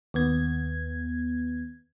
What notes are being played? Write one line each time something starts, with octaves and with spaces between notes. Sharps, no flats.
D#2 B3 G#6